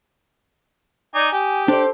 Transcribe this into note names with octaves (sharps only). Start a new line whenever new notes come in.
D#4 D5 G#5
G4 G#5 D#6
D4 A4 C5 D5 A5